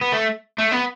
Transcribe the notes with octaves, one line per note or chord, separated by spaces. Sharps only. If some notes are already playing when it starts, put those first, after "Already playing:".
B3
A3
A3
B3